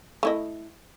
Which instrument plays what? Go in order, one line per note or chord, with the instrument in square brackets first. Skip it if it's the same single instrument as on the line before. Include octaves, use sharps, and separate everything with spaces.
[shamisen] A3 E4 D#5